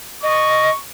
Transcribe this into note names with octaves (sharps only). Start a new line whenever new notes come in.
D#5 C#6